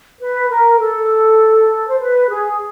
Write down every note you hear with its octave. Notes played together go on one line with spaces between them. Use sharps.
B4
A#4
A4
C5
B4
G#4